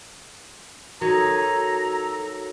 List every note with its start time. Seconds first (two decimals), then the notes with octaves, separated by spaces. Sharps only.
1.01 F#3 D#4 F#4 A4 A#4 C#5 A#5